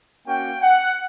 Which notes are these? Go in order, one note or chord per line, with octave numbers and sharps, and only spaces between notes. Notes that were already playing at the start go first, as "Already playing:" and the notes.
A#3 C#4 F#4 G5
F#5